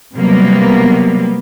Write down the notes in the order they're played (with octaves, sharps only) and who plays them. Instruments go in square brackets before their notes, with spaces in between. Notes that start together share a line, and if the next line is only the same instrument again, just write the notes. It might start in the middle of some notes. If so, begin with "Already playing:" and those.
[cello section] C3 F#3 G3 A#3 B3